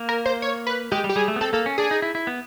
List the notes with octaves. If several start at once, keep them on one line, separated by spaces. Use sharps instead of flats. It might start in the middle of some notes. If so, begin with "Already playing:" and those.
Already playing: A#3
A#4
C5
C#5
B4
G#3 G4
G3
G4
G3 G#4
A3
B3
C4 A4
A#3 A4
C#4
D4 G#4
D#4
E4
E4
B3